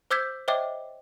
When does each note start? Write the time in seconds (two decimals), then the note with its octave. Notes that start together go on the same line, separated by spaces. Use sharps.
0.11 C5 D6 E6 G6 G#6 B6
0.48 C5 C#5 D#5 E5 G5 D6